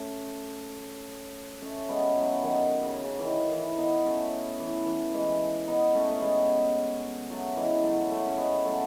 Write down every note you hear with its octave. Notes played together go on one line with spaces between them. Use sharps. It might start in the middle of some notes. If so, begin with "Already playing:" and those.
Already playing: A3 C#4
A3 C#4
G#3 B3
F#3 A3
D#3 F#3
C#3
C#3
E3
D#3
E3
B3 D#4
A3 C#4
E3
E3
E3 G#3
B3 D#4
A3 C#4
A3
G#3 B3
F#3 A3
E3 G#3
F#3 A3
F#3 A3
C#4
G#3 B3
F#3 A3